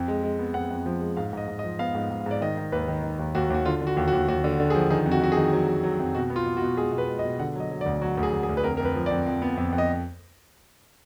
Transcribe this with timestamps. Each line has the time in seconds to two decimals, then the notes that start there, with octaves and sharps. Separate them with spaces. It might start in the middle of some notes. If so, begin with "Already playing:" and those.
Already playing: F2
0.08 G#3
0.23 G#3
0.39 B3
0.54 F2 F#5
0.70 F2
0.86 F3
1.01 G#3
1.17 G#2 F5
1.33 G#2 D#5
1.47 G#2
1.59 D#5
1.64 F3
1.79 B3 F5
1.95 G#2
2.11 G#2
2.20 F5
2.26 G#2 D5
2.41 D#3 D#5
2.57 D#3
2.72 D#2 B4
2.88 D#3
3.03 D#3
3.19 D#2
3.35 D#2 F#4
3.50 D#2 F#4
3.65 D3 F4
3.81 D3
3.87 F#4
3.97 D#2
4.08 F#4
4.13 D#2
4.28 D#2 F#4
4.44 D3
4.60 D3
4.70 G#4
4.75 F3
4.90 D#3 G#4
5.06 F2
5.11 F#4
5.21 F2 F#4
5.32 G#4
5.37 D#3
5.53 F#3
5.68 F#3
5.83 F#3
5.99 F2
6.15 B2 F#4
6.30 B3
6.36 F4
6.46 B2
6.57 F#4
6.62 B2
6.77 G#3 G#4
6.92 B2
6.98 B4
7.09 G#3
7.19 D#5
7.24 B2
7.39 D3 F#5
7.55 F#3 D#5
7.71 F#3
7.81 D5
7.86 D2
8.01 F#3 F#4
8.18 D2
8.23 G#4
8.33 D2
8.43 G#4
8.49 D2
8.57 B4
8.64 F2 A#4
8.77 F2 A#4
8.85 B4
8.95 F3
9.06 F2 D5
9.26 F2
9.42 B3
9.57 F2
9.72 F2
9.78 D#5